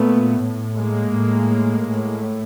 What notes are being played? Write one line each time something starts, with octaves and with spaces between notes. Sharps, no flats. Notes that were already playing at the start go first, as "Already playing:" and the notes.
Already playing: A#2 A3 B3
A2
G#3 A#3
A2
A2